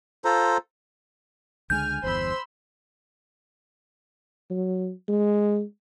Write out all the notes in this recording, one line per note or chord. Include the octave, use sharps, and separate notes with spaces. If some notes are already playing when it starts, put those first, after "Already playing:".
F4 A4 C5 A#5
C#2 D3 G#3 G#5 F6 G6
G1 E2 C5 B5 C6 E6
F#3
G#3